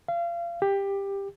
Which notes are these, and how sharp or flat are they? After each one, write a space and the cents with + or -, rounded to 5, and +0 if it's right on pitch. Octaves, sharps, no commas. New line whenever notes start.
F5 -30
G4 +15